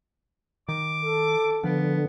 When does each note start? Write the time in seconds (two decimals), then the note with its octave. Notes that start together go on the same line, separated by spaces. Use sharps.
0.68 D#3 D6
1.04 A4
1.64 D3 F3 B3